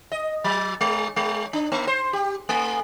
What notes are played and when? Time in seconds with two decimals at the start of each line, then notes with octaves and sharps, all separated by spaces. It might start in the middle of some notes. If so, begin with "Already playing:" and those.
0.12 D#5
0.44 F#3
0.81 G#3
1.16 G#3
1.53 D4
1.72 A#3
1.87 C5
2.13 G4
2.49 A3